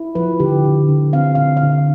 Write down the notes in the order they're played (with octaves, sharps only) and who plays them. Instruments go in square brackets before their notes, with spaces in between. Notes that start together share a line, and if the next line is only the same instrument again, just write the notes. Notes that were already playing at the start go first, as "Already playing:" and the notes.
Already playing: [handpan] E4
F3 B4
D3 G4
D3
D3
C4 F5
D3 F5
F5
D3